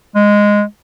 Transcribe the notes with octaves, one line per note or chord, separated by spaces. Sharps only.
G#3